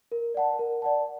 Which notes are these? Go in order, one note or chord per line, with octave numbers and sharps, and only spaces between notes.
A#4
D5 F#5 A5
A#4
D5 F#5 A5